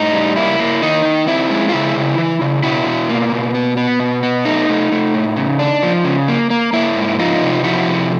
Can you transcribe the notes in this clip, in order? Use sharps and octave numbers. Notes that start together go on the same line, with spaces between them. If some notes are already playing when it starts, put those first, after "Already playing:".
Already playing: A2 D#4
G3
A#3 E4
A#3
D#3 D#4
D#3
C4 E4
G#3
F4
C#3 E4
C#3
E3
C#3
B2 E4 F#4
B2
A#3
B2
B3
B3
B2
B3
A3 D#4
A3
A3
A2
C#3
D4
F3
C#3
A#3
A#3
A#3 E4
G#2
F3 D#4 F4
C3
F3 E4 F#4
C3